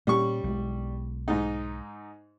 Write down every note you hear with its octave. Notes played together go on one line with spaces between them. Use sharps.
A#2 G3 C#4 C#6
B1 G#3
G#2 D#4